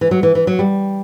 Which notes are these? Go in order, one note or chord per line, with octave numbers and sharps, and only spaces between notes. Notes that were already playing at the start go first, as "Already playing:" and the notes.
E3
F#3
E3
E3
F#3
G3